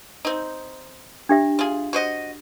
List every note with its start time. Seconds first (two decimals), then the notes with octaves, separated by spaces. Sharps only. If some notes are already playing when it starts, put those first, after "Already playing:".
0.25 C4 D#4
1.29 D4 G4 E5
1.59 F4 G#4
1.93 F#4 C5 D#5